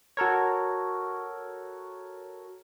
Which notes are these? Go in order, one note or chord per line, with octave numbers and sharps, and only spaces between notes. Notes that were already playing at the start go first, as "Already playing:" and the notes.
F#4 A4 A#4 C#5